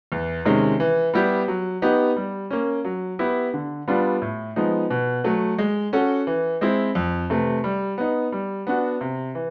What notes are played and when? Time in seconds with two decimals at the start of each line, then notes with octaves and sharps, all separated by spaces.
0.12 E2
0.45 C3 D#3 G#3 C#4
0.80 E3
1.14 G3 B3 E4 G4
1.48 F#3
1.82 B3 D#4 G4
2.16 G3
2.51 A#3 C#4
2.85 F#3
3.19 B3 E4 G4
3.54 D3
3.88 G3 B3 D4 F4
4.22 A2
4.56 F3 G#3 B3 D#4
4.90 B2
5.24 F#3 A3
5.59 G#3
5.93 C#4 F#4 A4
6.27 E3
6.61 G#3 C4 E4
6.95 F2
7.30 C3 E3 A3
7.64 G3
7.98 B3 D#4
8.32 G3
8.67 B3 D4 F#4
9.01 C3
9.35 E3